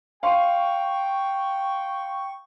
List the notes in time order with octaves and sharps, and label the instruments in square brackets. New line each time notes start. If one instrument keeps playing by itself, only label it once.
[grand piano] F5 C6 [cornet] G5 [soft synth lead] C#6